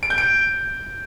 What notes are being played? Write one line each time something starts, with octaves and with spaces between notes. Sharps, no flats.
D7
G6
D7